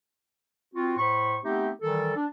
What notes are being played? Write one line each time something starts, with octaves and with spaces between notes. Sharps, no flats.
C4 F4 F#4
A2 C5 B5 C#6
A3 B3 C4 D#4 G4
D#3 E3 G3 A4
D4